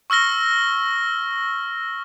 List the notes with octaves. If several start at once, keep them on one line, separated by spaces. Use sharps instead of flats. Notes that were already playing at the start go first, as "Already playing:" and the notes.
C#6 E6 F6 A#6 G7